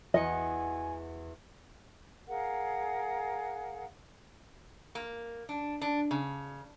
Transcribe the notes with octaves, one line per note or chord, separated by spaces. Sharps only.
E2 F#4 D#5 G#5 C#7
G#4 A#4 F5 F#5
A#3
D4
D4
C#3